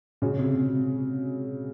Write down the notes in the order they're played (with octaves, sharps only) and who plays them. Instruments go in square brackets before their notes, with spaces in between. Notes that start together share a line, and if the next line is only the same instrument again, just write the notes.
[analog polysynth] A#2 G#3 C#4 F#4 [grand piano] C#3
[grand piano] C3
C3